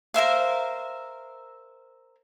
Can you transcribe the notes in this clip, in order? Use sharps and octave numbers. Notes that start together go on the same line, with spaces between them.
A#4 C5 E5 F5